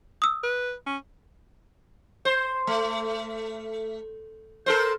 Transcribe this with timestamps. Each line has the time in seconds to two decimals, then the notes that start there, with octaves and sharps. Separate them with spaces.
0.22 D#6 E6
0.44 B4
0.86 C#4
2.25 C5
2.67 A3
4.66 A4 A#4 C5